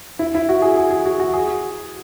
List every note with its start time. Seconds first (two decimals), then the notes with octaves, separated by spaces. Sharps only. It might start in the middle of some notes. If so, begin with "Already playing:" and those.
0.19 E4
0.35 E4
0.49 F#4
0.62 G#4
0.77 G#4
0.91 G#4
1.06 F#4
1.20 F#4
1.33 G#4